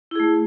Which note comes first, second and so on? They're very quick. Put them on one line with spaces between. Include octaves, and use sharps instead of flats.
E4 G#4 A3